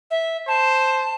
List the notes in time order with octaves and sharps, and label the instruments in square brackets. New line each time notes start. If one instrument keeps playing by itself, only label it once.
[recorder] E5
[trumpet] C5 [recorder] A5